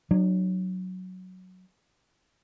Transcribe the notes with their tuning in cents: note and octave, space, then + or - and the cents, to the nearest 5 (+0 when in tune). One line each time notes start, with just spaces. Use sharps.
F#3 +0 D4 +40